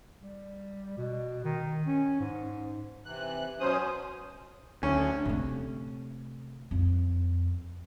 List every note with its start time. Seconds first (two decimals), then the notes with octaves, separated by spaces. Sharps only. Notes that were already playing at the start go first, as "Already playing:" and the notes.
0.22 G3
0.97 B2
1.45 D#3
1.86 C#4
2.20 G#2
3.05 C3 E3 F#6
3.60 B2 F#3 C#4 C5 D#6
4.83 D2 C#4
5.25 C3 A3
6.71 F2